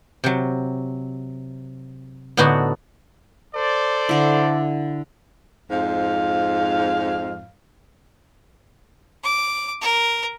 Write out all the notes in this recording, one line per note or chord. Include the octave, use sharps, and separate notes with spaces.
C3 F#3
A2 D3 B3 D4 D#4 F#4
A4 C5 D5
D3 E4
F2 G#2 F5
D6
A#4